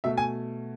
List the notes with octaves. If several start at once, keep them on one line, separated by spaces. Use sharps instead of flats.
B2 A3 E5
G#5